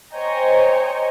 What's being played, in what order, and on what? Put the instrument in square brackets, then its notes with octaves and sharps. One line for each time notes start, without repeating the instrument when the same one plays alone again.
[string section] C5 C#5 D#5 G5 G#5 A#5